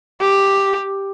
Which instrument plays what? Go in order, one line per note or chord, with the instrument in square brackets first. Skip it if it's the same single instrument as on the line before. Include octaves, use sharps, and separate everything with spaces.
[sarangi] G4